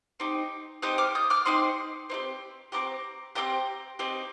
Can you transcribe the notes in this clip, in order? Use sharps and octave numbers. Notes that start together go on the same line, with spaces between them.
C4 D#4 G4
C4 D#4 G4 D#6 G6
D6 F6
D#6 G6
D6 F6
C4 D#4 G4 C6 D#6
C4 D#4 G4
C4 D#4 G4 A#5 D6
C4 D#4 G4 G5 A#5
C4 D#4 G4